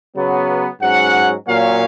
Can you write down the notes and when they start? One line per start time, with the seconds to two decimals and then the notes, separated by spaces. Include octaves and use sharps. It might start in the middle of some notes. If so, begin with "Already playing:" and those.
0.17 C#3 F#3 B3
0.82 G#2 F#3 C#4 F#5
1.47 A#2 F#3 A#3 C#4 F5